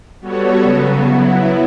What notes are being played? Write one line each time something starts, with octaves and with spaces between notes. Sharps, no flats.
G3 B3 F#4 A4 C#5
C#3 F#3 B3
F#3 B3 E4